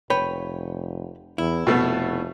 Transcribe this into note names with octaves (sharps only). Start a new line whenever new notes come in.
F1 B4 C#5 G5
E2 E4
F1 B2 A3 B3